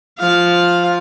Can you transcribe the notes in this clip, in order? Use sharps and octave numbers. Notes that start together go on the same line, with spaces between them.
F3 F5